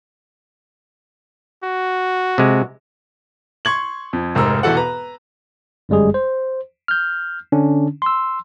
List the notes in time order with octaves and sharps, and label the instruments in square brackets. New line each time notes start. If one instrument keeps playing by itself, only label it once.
[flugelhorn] F#4
[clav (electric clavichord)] C3 G#3
[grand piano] C6 C#6 G#6 F#7
F2
F1 G#2 A#4 E6
E1 E3 F#4 A4 F#5
B4 A#5
[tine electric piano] G1 F#2 G3 G#3 G#4
C5
F6 G6
D3 C#4 D4
C6 E6